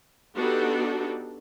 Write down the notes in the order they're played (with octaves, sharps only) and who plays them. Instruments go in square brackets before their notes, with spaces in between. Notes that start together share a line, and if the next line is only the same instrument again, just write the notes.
[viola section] B3 D4 D#4 F#4 G4 A4